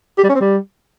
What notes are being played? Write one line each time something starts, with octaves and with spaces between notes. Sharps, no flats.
G4
G3
C#4
C4
G3